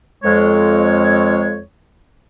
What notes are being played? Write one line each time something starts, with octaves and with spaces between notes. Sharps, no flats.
F2 G#3 C#5